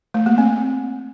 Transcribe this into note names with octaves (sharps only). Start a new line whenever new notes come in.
A3
A#3
C4